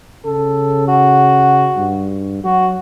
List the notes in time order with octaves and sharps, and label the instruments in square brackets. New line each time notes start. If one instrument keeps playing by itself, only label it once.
[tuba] C#3 [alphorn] A4
[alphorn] F#4
[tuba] G2
[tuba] F#3 [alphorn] F#4